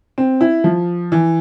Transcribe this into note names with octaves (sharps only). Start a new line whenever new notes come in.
C4
E4
F3
E3